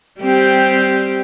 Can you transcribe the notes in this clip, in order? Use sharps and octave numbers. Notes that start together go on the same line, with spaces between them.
G3 C4 G4